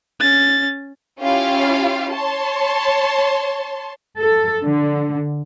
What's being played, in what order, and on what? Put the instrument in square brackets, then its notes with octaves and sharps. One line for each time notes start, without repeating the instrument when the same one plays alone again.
[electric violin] C#4 A6
[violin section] C#4 E4 F4 G4 F5
C#5 A5 C6
[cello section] A4
D3